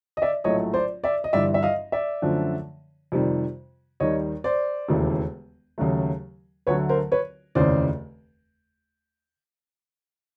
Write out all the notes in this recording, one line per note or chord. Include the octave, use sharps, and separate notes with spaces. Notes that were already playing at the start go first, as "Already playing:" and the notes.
D#5
D5 E5
A#1 A2 F#3 A3 C#5 D#5
C5 D5
D5 E5
D#5
G1 G2 E3 D5 E5
E5
D#5 F5
D5 E5
F#2 D3 F3 A3
F2 C3 D#3 G3
D#2 D#3 G3 C#5 D#5
C5 D5
E1 D#2 C#3 E3 A3
D#2 C#3 F#3 A3
D2 D3 F#3 A3 B4 C#5
A#4 C5
B4 C#5
F1 D#2 C#3 E3 C5 D5